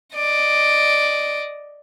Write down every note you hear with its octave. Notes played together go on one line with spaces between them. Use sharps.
D5 D#5